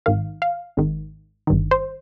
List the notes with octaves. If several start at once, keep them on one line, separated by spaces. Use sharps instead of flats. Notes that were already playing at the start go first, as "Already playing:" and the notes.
G#1 G#2 D#3 F5
F5
G#1 G#2 D#3
G1 G2 D#3
C5